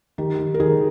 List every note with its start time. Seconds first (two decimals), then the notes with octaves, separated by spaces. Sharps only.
0.18 D#3 G4
0.39 D#3
0.54 A#4
0.60 D#3 G#4